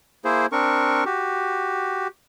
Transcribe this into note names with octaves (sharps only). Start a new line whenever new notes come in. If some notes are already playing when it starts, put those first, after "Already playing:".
A#3 E4 G#4 C5
C4 D4 A#4 C#6
F#4 G4